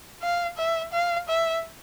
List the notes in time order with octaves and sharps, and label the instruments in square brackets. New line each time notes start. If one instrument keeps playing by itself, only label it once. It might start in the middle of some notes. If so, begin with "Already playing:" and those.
[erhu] F5
E5
F5
E5